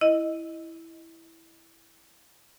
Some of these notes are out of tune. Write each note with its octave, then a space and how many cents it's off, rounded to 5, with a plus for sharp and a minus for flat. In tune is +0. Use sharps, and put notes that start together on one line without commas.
E4 +0 D#5 +0